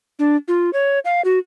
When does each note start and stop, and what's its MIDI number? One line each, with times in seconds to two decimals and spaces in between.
0.19 0.36 62
0.48 0.70 65
0.73 0.99 73
1.05 1.22 77
1.25 1.39 66